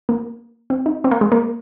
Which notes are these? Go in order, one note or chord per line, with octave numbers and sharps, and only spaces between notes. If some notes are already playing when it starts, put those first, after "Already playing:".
A#3
C4
D#4
C4
A#3
G#3
A#3